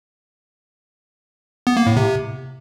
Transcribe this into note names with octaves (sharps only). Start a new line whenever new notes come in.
B3
A#3
A2
C3